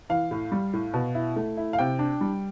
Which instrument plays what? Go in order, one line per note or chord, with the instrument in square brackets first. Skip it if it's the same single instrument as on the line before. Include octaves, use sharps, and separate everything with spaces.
[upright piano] E3 F5
A2
G3
A2
B2
E4
A3
E4
F5
C3 G5
D4
G3